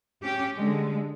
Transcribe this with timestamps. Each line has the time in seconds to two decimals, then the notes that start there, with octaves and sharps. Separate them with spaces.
0.23 C#4 G4
0.55 D3 G#3